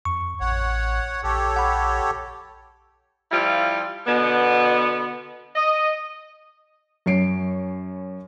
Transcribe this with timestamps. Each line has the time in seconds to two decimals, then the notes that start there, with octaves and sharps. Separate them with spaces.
0.05 F2 C#6
0.40 A1 C#5 F#5
1.23 A#1 G4 A4 C#5
1.56 F#5 B5
3.31 F3 G3 E4 F4
4.07 B2 D3 B3
5.56 D#5
7.06 F#2 C#5 C7 D7